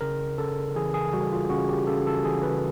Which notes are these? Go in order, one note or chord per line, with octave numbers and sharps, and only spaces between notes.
C#3 A#4
C#3 A4
E3 G#4
G#4
G3 F#4
F4
C#3 F#4
G4
C#3 A4
A4
E3 G#4
B4